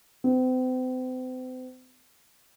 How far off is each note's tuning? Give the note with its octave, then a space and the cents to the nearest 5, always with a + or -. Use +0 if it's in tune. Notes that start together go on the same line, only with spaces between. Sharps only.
C4 -40